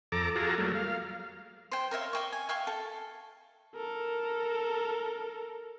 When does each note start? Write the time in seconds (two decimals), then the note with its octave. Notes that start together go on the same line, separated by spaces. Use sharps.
0.12 F2 A4 A#5 D6
0.36 F4 F#4 G#4 A4 A#5
0.58 F#3 G3 A3 A#3
0.75 F5
1.72 C5 G5
1.91 A#4 C#5 E5 F5
2.13 D5 G5 C#6
2.32 G#5
2.49 E5 F5 G5 C#6
2.67 A4
3.75 A4 A#4